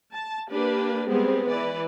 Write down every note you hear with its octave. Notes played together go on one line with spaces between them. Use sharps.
A5
A#3 D4 G4 B4
G3 G#3 B3 C4 G#4
E3 B4 D5